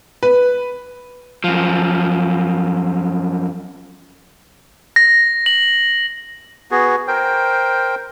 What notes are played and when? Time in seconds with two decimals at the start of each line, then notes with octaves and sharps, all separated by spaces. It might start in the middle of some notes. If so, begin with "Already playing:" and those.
0.23 B4
1.44 F#2 F3
4.96 A#6
5.46 F#7
6.71 B3 F#4 G#4
7.08 A#4 C5 G5